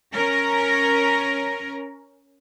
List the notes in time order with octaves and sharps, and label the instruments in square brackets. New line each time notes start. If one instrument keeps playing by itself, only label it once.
[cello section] C#4 A#4